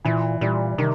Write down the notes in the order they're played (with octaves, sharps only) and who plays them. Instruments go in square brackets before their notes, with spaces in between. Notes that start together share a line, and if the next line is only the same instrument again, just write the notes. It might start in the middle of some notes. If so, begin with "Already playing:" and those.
[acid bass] A#2 [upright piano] E3
[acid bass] A#2 [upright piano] G3
[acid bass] C3 [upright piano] D#3